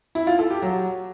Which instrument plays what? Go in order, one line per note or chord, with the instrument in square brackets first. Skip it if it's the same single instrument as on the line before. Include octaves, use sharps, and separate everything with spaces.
[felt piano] E4
F4
A4
G4
F#3